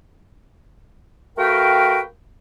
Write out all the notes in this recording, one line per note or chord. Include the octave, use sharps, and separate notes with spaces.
A3 F#4 A#4 B4 F5 G5